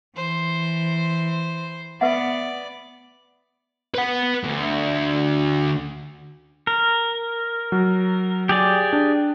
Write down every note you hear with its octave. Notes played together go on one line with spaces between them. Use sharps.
E3 C5
B3 B4 D5 E5 F#5
B4 F#5
D2
A#4
F#3
G4 G#4 D5
D4